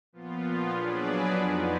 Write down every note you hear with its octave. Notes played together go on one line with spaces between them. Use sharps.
A#2 F3 B3 F4
F#3 D4 G#4 B4 D5
F2 F3 B3 D#4